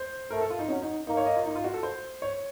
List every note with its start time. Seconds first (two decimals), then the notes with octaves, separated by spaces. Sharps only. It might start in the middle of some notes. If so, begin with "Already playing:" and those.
Already playing: C5
0.31 A3 A#4
0.41 A4
0.50 F4
0.59 D#4
0.69 F#3 C#4
0.82 D#4
1.07 A#3 D#4
1.17 C#5
1.26 D#5
1.36 F4
1.45 D#4
1.55 F4
1.64 F#4
1.74 A4
1.83 C5
2.22 C#5